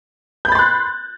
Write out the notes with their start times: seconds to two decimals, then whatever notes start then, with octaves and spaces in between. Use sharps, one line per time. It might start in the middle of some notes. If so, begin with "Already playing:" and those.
0.45 G6
0.48 B5
0.52 A6
0.55 C6
0.59 F#6